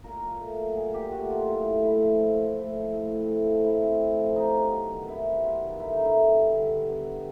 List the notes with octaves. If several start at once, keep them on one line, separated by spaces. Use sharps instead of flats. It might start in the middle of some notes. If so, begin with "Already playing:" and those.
A#2 A#4
A#2
A3
F#3
A#2 G#4
A#2 G4
A3 F#4
F#3 F4
A2 E4
A2
A3 E4
F3
A2
A2
A3
F3
A2
C4
A3
F3
A2 E4
C4
A3
F3
C3 D#4
B3
F#3
D#3
C3 E4
B3
F#3 F4
D#3
D3 E4
D#4
D3
E4
B3
G3
D3
D3
B3
G3